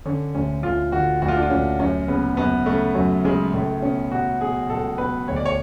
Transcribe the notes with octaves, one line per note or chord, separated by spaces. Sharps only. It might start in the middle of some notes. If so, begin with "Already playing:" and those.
D3 C#4
D2 C#4
D2 F4
D3 F#4
D2 F#4
F4
D4
F4
D2 C#4
F#2 C#4
C#3 B3
F#2 B3
C#3 A3
F#2 F#3
C#3 G#3
C#2 A3
B2 C#4
B2 F#4
B2 G#4
C#2 A4
B2 B4
D2 C#5
D5
C#5